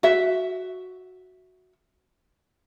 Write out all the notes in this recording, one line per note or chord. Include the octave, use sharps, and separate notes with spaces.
F#4 E5